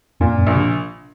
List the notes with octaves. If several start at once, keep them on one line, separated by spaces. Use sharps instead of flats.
F2 A#2
F#2
A#1
C3